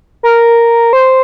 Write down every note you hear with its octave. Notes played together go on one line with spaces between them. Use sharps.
A#4
C5